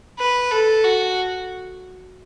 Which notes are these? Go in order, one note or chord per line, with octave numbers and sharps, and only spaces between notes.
B4
A4
F#4